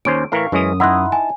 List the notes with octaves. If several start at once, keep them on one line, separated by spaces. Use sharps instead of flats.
D#2 C#4 C5 D7
A2 E3 A#4 F5 C#6
F#2 E3 G#3 C#4 D#6
D#4 E4 D#5 F#5 C6 F#6
G#5 A5